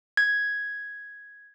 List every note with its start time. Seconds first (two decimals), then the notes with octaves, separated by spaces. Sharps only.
0.17 G#6